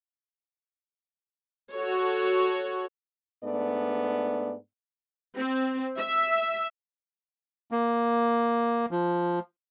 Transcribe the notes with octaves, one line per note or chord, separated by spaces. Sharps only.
F#4 A4 C#5
G#2 A3 B3 D4 D5
C4
E5
A#3
F3